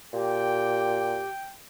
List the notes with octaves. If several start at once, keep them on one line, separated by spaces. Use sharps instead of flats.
A#2 G4 G5